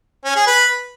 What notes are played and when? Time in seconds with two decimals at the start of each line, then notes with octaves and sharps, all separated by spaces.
0.25 C#4
0.36 G#4
0.47 B4